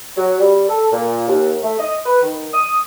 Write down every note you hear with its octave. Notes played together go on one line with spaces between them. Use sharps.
F#3
G3
A4
A#2
D#2
A3
D#5
B4
D#3
D#6